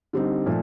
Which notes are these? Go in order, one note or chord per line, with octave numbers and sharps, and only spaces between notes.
D3 G3 C4 D#4
A#2 F3 A3